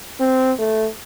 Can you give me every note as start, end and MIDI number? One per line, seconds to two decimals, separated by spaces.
0.20 0.52 60
0.59 0.87 57